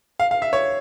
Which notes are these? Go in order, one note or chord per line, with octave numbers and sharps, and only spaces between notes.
F5
F5
E5
C#5